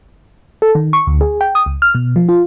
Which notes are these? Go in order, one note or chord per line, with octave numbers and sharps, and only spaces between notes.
A4
D#3
C#6
D2
G#4
G5
D#6
C#2
F6
B2
F3
F4